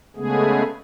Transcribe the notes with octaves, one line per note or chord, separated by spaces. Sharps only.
C#3 G#3 A3 B3 G#4